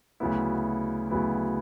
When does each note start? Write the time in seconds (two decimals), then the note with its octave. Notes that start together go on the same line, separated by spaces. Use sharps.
0.20 D2 C#3 F#3 B3 E4
1.11 D2 C#3 F#3 B3 E4